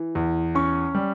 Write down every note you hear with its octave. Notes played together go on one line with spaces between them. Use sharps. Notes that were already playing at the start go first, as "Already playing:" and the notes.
Already playing: E3
E2
C#4 C#6
G3